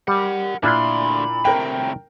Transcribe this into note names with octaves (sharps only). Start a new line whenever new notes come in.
G3 A#4 F#5
D2 A#2 D4 E4 F4 B5 C6
A2 C3 A#4 G5